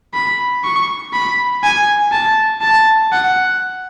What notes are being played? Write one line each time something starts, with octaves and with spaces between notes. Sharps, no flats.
B5
C#6
B5
G#5
A5
A5
F#5